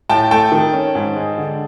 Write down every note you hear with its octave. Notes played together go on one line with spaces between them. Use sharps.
A2 G5 A5
A3 G5 A5
D#3
C#4
G#2
G#3
D3